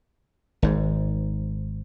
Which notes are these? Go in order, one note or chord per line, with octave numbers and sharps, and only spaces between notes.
G#1 G#2